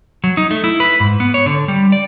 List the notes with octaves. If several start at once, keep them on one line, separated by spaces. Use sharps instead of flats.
F#3
D#4
A3
E4
B4
G#2
B3
C#5
D3
G3
D5